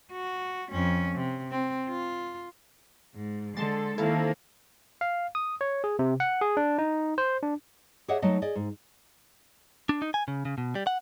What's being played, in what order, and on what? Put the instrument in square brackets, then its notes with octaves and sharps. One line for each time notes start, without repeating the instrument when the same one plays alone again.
[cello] F#4
F2 C#4
C3
C4
F4
G#2
[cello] D3 A4 [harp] G#3 [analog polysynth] A5 C6 A6
[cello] D#3 A#3 [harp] C4 F5 A5 [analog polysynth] E4 A4
[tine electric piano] F5
D#6
C#5
G#4
C3
F#5
G#4
D4
D#4
C5
D4
[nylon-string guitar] G4 G#4 C#5 D#5 E5 F#5
F#3 A3 D#4 D#5
G#4 D5 D#5
G#2
[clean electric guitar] D4
D#4
G#5
C#3
C#3
B2
G3
F#5